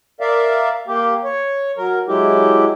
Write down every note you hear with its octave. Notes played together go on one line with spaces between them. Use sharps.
A#4 D5 E5 F5
A#3 G4
C#5
F#3 A#4
F#3 G#3 E4 G4